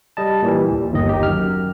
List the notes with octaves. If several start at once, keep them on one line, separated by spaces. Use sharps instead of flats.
G3 D#5 A5
A#2 E3 G3
D#2
G1 D#2 D#3 D#5
D#4 G4
F#2 F6